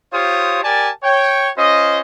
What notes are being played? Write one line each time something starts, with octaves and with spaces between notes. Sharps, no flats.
F4 G4 C5 C#5 F5 D#6
G4 A#4 D5 G#5 A5
C#5 G5
C#4 F4 C5 D#5